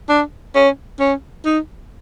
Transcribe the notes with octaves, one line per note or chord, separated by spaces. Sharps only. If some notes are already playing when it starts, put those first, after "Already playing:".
D4
C#4
C#4
D#4